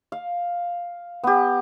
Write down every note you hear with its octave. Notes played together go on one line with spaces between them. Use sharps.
F5
B3 G4